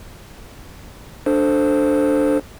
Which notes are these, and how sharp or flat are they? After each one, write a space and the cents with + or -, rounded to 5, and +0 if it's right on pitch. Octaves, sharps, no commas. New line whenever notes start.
D4 +0 A4 +0 C5 +0